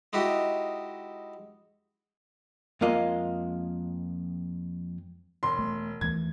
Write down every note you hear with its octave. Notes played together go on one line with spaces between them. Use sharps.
G#3 D#4 E4 F#4 G4
F2 G#3 A#3 F4 D#5
E1 C6
A3
D#2 E3 A3 G#6